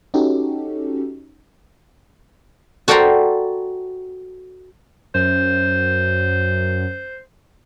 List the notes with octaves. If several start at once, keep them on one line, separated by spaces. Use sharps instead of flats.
C#4 D#4 F#4 G4 A4
F#4 A4 D5 G5 A#5 C6
F#2 C5